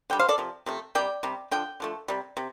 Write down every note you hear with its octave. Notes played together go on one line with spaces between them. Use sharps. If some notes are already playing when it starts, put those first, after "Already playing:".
D3 G3 G5
C5 F5
A4 D5
C3 F3
C3 F3 A3
C3 G3 D5 G5
C3 G3
D3 F3 G5
D3 F3 A3
C3 G3
C3